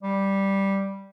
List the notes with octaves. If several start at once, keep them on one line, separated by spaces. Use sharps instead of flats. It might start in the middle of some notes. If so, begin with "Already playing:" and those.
G3